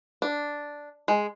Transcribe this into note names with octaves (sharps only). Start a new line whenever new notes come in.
D4
G#3